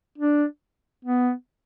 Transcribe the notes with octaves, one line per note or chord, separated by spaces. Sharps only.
D4
B3